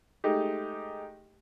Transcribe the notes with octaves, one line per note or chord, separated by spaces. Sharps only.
G#3 A3 D#4 G4